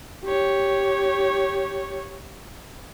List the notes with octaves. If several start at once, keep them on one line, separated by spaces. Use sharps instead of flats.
G4 C#5